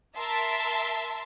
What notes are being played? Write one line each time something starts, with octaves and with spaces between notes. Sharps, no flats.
A#4 E5 A5 C6